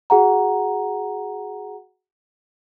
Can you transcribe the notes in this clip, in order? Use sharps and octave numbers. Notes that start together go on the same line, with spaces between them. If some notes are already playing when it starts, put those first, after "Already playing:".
F#4 G#4 F#5 A#5